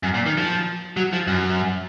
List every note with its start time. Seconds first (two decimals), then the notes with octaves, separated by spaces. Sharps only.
0.03 F#2
0.14 A#2
0.26 D#3
0.38 F3
0.97 F#3
1.13 F3
1.27 F#2